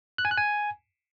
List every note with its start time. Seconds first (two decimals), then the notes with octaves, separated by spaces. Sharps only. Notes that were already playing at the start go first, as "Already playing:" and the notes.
0.18 F#6
0.25 G#5
0.31 F#6
0.37 G#5